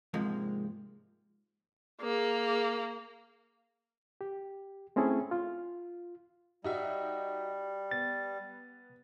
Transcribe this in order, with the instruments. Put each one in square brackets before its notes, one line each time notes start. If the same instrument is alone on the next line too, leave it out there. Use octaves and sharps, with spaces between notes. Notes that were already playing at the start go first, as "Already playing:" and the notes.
[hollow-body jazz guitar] G#2 C3 F3 G#3 A#3
[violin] A#3 [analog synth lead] G#4
[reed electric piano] G4
A3 C4 C#4 E4 G#4 A4
F4
[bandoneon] G3 [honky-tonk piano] D#4 F#4 E5
[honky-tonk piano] B3 [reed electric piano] A6